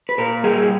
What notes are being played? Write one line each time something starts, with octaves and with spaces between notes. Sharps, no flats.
B4
A#2 A#4
G3 G#4